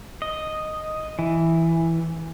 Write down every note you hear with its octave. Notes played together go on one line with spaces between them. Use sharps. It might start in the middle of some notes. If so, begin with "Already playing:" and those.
D#5
E3